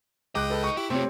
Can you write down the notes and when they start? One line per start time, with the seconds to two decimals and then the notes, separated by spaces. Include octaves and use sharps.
0.35 C#2 G#3 D#5 G5 D6 F#6
0.50 A4 B4
0.64 D#4 D#5 C#6
0.77 E4 G4
0.90 C3 A3 C4 F4 G4 C#5